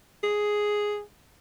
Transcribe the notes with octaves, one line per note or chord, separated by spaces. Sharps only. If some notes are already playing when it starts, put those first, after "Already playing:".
G#4